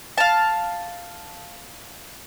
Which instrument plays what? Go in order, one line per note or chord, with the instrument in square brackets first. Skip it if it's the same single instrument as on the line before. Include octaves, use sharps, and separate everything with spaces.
[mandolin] F5 A5